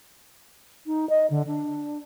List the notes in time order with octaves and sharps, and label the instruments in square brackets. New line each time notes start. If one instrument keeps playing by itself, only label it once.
[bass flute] D#4
D#5
D3
D4